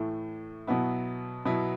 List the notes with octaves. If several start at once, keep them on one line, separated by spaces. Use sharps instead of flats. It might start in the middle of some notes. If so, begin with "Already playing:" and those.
Already playing: A2 E3 A3
B2 F#3 B3 E4
B2 F#3 B3 E4